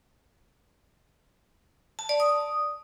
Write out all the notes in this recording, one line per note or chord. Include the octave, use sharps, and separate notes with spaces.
A5
D5
D#6